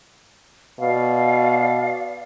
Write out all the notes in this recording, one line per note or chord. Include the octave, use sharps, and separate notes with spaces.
B2 D5 F5